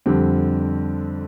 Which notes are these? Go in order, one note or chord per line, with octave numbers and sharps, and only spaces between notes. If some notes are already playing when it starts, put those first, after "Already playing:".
F2 D3 G3 C4